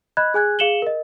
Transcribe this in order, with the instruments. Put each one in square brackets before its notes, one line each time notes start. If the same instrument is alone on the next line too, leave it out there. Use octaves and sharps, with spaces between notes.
[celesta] D#5 B5 F#6 G#6
G#4 G#5 F#6 G#6
G#4 F5 C#7 E7 F#7 G7
A#4 D#5